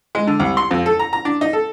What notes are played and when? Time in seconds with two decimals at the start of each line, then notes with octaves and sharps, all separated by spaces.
0.15 G#3
0.27 D3
0.39 C2
0.57 C6
0.71 F2
0.86 A4
0.99 A#5
1.13 A#5
1.25 D4
1.41 D#4
1.53 A4